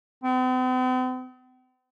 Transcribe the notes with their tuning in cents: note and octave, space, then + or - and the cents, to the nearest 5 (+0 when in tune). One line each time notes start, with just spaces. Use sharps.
C4 -45